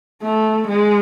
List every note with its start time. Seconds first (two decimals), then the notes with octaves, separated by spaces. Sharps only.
0.23 A3
0.69 G#3